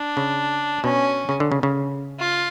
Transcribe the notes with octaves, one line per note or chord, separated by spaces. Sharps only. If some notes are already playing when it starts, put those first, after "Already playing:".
Already playing: D4
C#3
B2 C#4
C#3
D3
C#3
C#3
F4